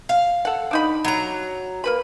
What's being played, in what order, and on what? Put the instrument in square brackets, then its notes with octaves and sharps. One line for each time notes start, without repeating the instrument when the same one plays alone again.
[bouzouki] F5
[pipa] A4 F#5
D4 D#4 B5
[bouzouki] F#3 A#5
[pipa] A#3 B4 B5